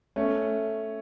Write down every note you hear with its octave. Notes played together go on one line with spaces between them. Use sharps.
A3 C#4